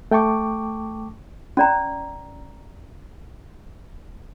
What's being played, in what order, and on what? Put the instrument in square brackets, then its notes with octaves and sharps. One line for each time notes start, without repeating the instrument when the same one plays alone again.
[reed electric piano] A3 G5 A5 C#6 D6
[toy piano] C#4 D5 A#5